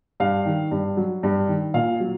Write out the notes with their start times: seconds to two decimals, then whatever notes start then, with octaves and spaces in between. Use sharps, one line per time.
0.20 G2 F5
0.46 D#3
0.71 G2
0.97 F#3
1.23 G2
1.48 D#3
1.74 A#2 F5
2.00 F#3